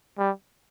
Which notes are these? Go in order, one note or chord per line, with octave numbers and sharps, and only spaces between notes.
G3